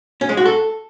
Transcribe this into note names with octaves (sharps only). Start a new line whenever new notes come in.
C#4
G#3
F#4
A4